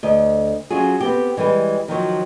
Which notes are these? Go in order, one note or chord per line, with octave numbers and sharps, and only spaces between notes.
D2 D#5
F#3 C#4 F4 F#4 G#4
B3 C4 G4
E3 G3 G#3 B4
D#3 F3 F#3 C5